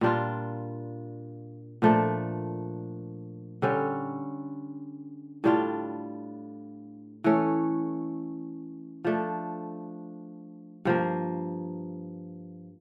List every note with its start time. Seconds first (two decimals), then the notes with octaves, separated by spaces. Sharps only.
0.01 A#2 G3 D4 F4
1.82 A#2 F3 A3 D4
3.62 D3 G3 C#4
5.44 A2 G3 D4 F4
7.24 E3 A3 C#4
9.04 F3 A3 D4
10.85 G2 F3 A#3